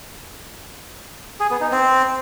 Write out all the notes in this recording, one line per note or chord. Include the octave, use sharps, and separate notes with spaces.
G#4
B3
D#4
C4